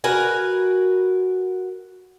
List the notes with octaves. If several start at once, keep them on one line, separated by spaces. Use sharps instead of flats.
F#4 A#4 B4 G#5